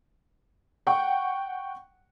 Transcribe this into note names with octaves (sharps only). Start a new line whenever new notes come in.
F#5 G5 C#6